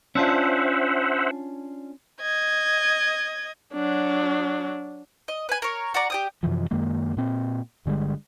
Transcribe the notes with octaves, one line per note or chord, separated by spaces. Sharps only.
C#4 D4 F4 C5 E5 F#5
D#5 G#6
F#3 D4
D#5
B4 G#5
A#4 C#5
F#4 D5 A#5
G4 G5 D#6
F#2 C3 E3 F3
F#2 D#3 G#3 A#3
A#2 C4
G1 D3 G3 G#3